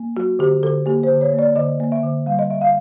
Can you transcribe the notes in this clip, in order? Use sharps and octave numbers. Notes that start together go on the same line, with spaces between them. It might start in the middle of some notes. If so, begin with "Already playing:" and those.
Already playing: A#3
F#3 F#4
D3 G4
D3 A4
A#3 G4
C5
D3
C#5
A#3
D5
D3 D#5
A#3
E5
D3
G3 F5
D#5
G3 E5
F5